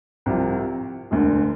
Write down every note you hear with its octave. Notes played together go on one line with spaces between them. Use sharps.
C2 C3 F3
E1 D2 D3